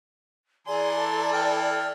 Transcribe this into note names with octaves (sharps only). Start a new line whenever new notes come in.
E3 G#4 D5 A#5 C6
A4
E3 G5 F6